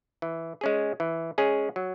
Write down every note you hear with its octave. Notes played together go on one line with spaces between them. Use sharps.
E3
G#3 C#4 G#4
E3
G#3 C#4 G#4
F#3